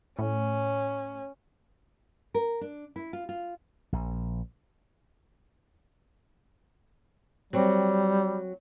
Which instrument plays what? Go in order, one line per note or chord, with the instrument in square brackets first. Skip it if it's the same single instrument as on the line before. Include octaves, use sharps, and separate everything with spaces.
[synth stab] A2 [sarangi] C#4
[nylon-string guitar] A#4
D4
E4
F4
F4
[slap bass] A#1
[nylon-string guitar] F#3 C4 [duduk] G3